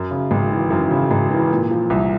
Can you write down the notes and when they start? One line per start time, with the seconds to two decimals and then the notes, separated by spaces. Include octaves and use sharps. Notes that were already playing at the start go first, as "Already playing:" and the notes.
Already playing: F#2
0.11 C#3
0.31 G#1
0.51 E3
0.70 F#2
0.91 C#3
1.11 G#1
1.30 E3
1.51 A#2
1.71 F3
1.90 C2